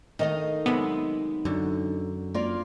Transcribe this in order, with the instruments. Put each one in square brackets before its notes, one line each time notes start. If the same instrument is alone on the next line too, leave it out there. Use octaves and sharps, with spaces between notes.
[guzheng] D#3 A3 [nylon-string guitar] D#4 D#5 F5
[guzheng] C3 F#3 G#3 [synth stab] B3
[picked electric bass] F#2 [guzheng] D3
[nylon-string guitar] A#3 F4 D5